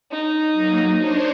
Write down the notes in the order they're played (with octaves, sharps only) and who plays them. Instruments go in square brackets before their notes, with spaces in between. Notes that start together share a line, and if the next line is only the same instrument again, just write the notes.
[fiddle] D#4
[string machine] F#3 A#3
D4 C5 C#5